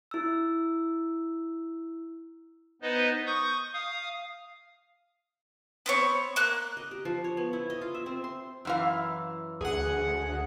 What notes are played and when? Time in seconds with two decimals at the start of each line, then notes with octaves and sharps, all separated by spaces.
0.11 E4 E6
2.82 B3 D#4 B4 C5 D#5
3.26 C#6 D#6 G6
3.74 F5 D#6
5.86 B3 C4 C#5
6.36 A#3 F#6
6.77 D#5
6.91 G4
7.05 F3
7.24 C#5
7.37 B3
7.53 E4
7.70 D#5
7.81 F4
7.94 E5
8.06 C4
8.24 C6
8.65 F#2 E3 F5
9.61 D2 G#4 F#5